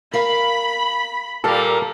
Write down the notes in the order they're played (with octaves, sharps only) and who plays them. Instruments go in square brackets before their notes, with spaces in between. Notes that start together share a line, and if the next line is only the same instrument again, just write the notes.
[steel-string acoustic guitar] A#4 F5 [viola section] B5
[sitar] A#2 G3 A#3 [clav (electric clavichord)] A4 F5